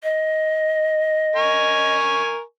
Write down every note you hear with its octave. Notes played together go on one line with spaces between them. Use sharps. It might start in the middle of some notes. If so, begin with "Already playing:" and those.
D#5
A#4 G#5 C#6